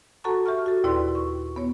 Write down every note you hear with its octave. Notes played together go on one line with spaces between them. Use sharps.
F#4 A4 F#5 A5 A#5 C#6
G4 E5 C#6 F6
F#4 A4
D#2 A#2 E4 B4 D5 C6
C#6
B3 C#5